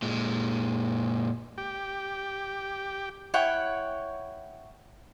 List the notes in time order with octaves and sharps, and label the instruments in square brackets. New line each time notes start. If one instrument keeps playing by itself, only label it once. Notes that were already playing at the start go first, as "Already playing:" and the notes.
[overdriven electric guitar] A#2 G#3
[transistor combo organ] G4 G5
[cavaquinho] E4 C#5 F#5 G5